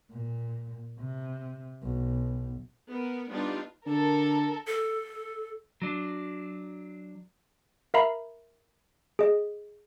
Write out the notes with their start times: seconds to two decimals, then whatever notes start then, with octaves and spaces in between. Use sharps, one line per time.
0.11 A#2
0.99 C3
1.83 B1
2.90 B3 A#4
3.30 G3 B3 D4 D#4 F4
3.86 D3 A4 A#4
4.67 A4
5.82 F#3 D4
7.94 A#4 E5 F5 A#5 B5
9.19 G#4 D#5